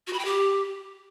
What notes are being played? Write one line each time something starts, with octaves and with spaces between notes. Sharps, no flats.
F#4
B5
G5
G4